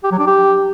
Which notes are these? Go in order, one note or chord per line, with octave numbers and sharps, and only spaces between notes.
G4
F#3
D4
G4